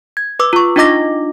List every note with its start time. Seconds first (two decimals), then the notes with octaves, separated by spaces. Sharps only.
0.17 G#6
0.39 B4 D6 E6
0.53 F4 C#6
0.76 D4 D#4 F4 D#5 D6 A#6